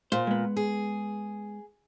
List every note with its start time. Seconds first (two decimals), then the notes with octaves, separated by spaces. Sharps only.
0.12 A#2 C5
0.27 G#3 B3
0.56 G#4